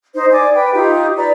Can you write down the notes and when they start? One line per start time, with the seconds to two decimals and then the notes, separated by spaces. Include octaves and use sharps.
0.14 D#4 C5
0.32 D5 G#5 D6
0.54 B4 G5
0.74 D#4 F4 G4
1.17 B4 D5 A#5